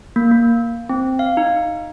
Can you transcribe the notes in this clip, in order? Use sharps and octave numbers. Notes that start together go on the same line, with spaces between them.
A#3
A#3
C4
F5
D#4